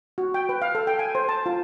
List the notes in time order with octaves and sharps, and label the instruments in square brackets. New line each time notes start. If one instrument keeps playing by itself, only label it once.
[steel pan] F#4
G5
B4
F5
A4
G5
G#5
C5
A5
F4